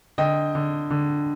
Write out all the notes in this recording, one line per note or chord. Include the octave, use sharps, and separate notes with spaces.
D3 D#5 G5
D3
D3